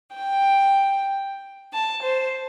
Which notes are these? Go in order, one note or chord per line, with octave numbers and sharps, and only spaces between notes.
G5
A5
C5